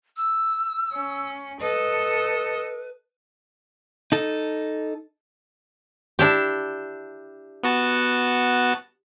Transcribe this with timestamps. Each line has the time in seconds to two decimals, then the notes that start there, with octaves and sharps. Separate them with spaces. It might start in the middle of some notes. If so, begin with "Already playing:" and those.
0.17 E6
0.94 C#4
1.61 A4 B4 D#5
4.12 D#4 A4
6.19 D4 E4 G4
7.63 B3 F#4 A5